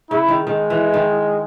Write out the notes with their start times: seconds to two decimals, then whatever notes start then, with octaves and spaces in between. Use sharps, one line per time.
0.10 C#3 E4
0.28 D#3
0.46 D#3 G#3
0.70 E3
0.94 D#3